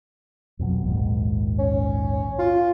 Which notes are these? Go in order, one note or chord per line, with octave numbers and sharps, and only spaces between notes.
F2 B2 F#3
A#1 D#2 G#2
C#4
F4